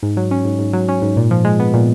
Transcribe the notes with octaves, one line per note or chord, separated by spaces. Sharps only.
G#2
F#3
C#4
G#2
G#2
F#3
C#4
G#2
A#2
F3
G#3
B3
A#2